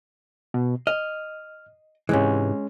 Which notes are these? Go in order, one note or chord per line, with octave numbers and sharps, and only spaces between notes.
B2
D#5 F6
G#2 C3 E3 G#3 C#4